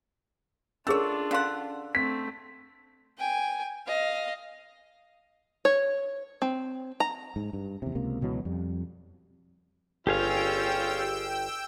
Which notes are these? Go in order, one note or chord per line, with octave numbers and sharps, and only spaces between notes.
A3 C#4 D4 F4 G#4 A#4 C#5 E6
D3 C#4 F5 F#5 C6
A3 C4 B6
G5 G#5
D#5 F5
C#5
C4
A#5
G#2
G2
E2 C3
C#2 C3 A#3
C#2 B2 E3 F#3
F2 G3
G1 C#4 F4 G4 G#4 F5 G5 E6